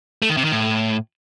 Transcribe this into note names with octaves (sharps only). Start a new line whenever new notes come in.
A3
D#3
C3
D#3
A2